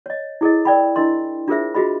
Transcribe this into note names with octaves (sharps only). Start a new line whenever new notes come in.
C#5 D#5
E4 G#4 A4 D#5
A#4 D5 G5 B5
D4 E4 A#4 D#5 C6
D4 F4 G#4 A#4 C5 E5
F4 F#4 G#4 D#5 B5